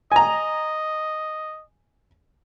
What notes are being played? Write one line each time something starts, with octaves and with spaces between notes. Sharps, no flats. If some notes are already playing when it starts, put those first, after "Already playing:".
D#5 G#5 A#5